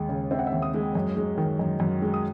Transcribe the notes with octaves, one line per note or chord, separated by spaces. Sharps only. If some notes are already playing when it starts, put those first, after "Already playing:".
Already playing: D#2 G#3
C#3
C4 E5
F#5
E5
D#2
D#6
G#3
F#2
G#3
D#3
F#2
F#2
G#3
D#6